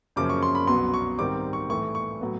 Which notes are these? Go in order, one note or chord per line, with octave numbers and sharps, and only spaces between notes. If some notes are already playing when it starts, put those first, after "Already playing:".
F#2 C#3 F3 A#3 C#4 D6
C#6
C6
B5
C2 B2 F#3 B3 C6
C#6
G#2 D#3 G3 C4 D6
C#6
A2 E3 A3 C#6
C#6
A2 F#3 B3